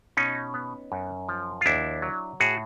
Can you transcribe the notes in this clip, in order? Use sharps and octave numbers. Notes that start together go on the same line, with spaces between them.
B2 C#4 D#4
B3
F#2
F3
F4
D#2 D4 E4
F#3
A2 F#4 G#4